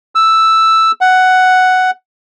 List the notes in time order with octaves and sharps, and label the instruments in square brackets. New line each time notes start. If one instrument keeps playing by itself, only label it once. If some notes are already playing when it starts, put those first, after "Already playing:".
[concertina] E6
F#5